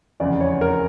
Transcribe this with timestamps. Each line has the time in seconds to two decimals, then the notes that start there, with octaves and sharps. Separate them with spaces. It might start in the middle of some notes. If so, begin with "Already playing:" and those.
0.20 F1 E2 C#3 D5
0.41 C#5
0.61 A#4